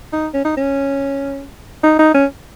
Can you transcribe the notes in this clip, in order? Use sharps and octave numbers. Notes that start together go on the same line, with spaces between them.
D#4
C#4
D#4
C#4
D#4
D#4
C#4